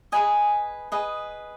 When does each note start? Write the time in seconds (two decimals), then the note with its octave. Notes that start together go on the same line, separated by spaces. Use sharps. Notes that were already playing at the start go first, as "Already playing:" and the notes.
0.12 G#4 B4 D#5 G#5
0.92 G#4 B4 D#5